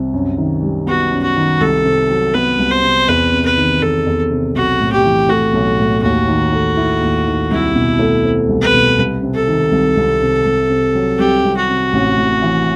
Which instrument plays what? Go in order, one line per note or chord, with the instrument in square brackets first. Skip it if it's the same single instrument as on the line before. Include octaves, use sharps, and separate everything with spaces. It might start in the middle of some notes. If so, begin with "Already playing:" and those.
Already playing: [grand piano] C2 C3
F#2
D#3
G3
[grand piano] B3 [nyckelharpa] F#4
[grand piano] F#2
[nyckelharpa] F#4
[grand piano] D#3
[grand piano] C2 [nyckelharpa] A4
[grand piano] C3
F#3
[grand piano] B3 [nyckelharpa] B4
[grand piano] C2
[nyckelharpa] C5
[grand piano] C3
[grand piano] E2 [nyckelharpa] B4
[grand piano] C3
[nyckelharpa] B4
[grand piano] D#3
[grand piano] E2 [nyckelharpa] A4
[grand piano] E2
C3
[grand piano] B1 [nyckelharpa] F#4
[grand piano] A2
[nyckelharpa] G4
[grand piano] E3
[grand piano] A3 [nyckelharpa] F#4
[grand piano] B1
A2
[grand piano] D#2 [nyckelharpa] F#4
[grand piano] D#3
A3
E4
D#2
D#3
[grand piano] C2 [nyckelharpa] E4
[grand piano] B2
A3
C4
C2
[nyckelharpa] B4
[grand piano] B2
C2
C3
[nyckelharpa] A4
[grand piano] D#3
C2
C2
C3
C2
C3
F#3
[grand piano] C2 [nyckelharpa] G4
[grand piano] C2
[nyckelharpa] F#4
[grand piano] C3
A1
A2
E3